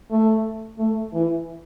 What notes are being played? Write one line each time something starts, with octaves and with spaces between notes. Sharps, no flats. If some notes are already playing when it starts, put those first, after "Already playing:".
A3
A3
E3